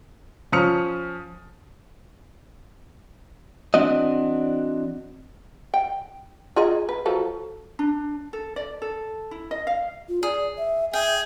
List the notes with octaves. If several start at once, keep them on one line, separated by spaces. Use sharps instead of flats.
F3 C#4 D#6 F6 C#7 F7
E3 C4 D4 F#4 D#5
G5
F4 G#4 D#5
B4
F3 F#3 A4
D4
A4
D5
A4
E4
D#5
F5
F4
G#4 D5
E5
G#4 E5 G5